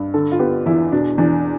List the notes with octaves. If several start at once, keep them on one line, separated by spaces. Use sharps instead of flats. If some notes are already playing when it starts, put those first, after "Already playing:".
Already playing: G2
D3 A4
F4
B3 G4
E2 E4
B2 D4
E2 D4